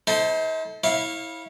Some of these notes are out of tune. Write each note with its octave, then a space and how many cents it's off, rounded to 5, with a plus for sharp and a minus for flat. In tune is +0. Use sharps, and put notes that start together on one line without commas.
D#4 +45 A4 +0 C5 +0
E4 -20 C#5 -25 F5 +0